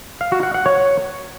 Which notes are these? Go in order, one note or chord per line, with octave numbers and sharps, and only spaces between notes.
F5
F#4
F#5
F#5
C#5